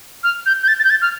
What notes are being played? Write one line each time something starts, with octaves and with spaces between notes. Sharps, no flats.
F6
G6
G6
A6
A6
G6
A6
F6